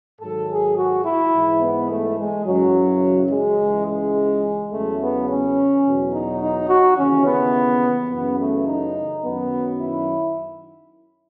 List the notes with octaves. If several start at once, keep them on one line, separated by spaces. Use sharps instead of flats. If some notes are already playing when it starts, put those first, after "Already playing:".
G#2 D#3 F#3 A4
G#4
F#4
E4
G#2 E3
B3
A3
G#3
F#2 C#3 E3 F#3
G#3
C#2 C#3 E3
G#3
E2 C#3 F#3 A3
B3
C#4
E2 B2 F#3
D#4
D#4
F#4
D#2 C#3 E3 C#4
B3
F#2 C#3 E3 B3
A3
D#4
F#2 D#3 F#3 B3
E4